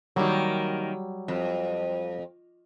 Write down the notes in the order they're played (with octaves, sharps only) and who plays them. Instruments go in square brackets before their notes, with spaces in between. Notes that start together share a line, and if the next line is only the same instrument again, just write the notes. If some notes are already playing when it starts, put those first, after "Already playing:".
[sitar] D#3 A#3 [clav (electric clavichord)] F#3 G3
[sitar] F2